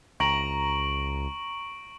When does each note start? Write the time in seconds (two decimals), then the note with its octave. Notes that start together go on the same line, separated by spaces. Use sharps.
0.20 C#2 A#5 C#6 D7 F#7